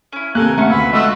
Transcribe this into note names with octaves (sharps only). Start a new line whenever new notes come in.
C#4 E4
D#2 C3 A#3 A4 A#4 G#5 F#6
A3 C#4 C5 F#5 C#6
D2 B4 E5 F5
G#3 A3 F4 F#4 D#5 F#5 E6